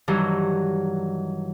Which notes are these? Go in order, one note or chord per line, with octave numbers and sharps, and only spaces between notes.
G2 D#3 E3 F#3 E4